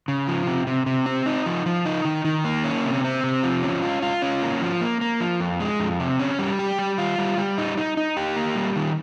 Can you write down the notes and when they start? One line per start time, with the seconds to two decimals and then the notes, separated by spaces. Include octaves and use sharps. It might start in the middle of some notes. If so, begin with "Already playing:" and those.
0.08 C#3
0.28 F3
0.47 C3
0.67 C3
0.86 C3
1.06 C4
1.26 D#4
1.46 F3
1.66 F3
1.85 D#4
2.05 D#3
2.25 D#3
2.45 A#3
2.64 C#4
2.84 C3
3.04 C4
3.24 C3
3.43 F3
3.63 C#4
3.83 F4
4.02 F4
4.22 C#4
4.42 A#3
4.62 F3
4.81 A#3
5.01 A#3
5.20 F3
5.40 F2
5.60 G#3
5.80 F2
6.00 C3
6.19 C#4
6.39 G3
6.59 G4
6.79 G3
6.98 F4
7.19 G3
7.38 G3
7.58 D#4
7.78 D#4
7.97 D#4
8.17 G4
8.36 A#3
8.56 G3
8.76 D#3